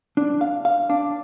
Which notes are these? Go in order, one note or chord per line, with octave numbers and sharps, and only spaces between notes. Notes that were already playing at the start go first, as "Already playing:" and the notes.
D4
F5
F5
D4